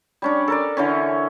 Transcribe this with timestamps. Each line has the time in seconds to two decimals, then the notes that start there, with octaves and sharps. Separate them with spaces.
0.22 G3 C#4 D4
0.48 A4 A#4 D5
0.77 D3 E3 C#4